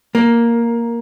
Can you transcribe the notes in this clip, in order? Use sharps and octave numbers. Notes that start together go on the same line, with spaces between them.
A#3